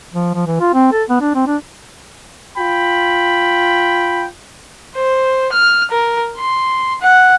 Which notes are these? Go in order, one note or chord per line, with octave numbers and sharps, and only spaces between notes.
F3
F3
E3
F4
C4
A4
B3
D4
C4
D4
F4 G5 B5
C5
F6
A#4
C6
F#5